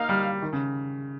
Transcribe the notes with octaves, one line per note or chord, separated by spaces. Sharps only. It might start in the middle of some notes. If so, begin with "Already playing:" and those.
Already playing: A#3 D#4 A#4 F5
G3
D#3
C#3